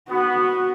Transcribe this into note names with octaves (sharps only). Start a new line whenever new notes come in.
B3 F#4